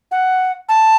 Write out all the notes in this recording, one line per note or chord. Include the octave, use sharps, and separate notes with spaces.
F#5
A5